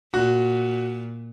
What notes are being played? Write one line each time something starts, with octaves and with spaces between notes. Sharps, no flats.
A#2 F#4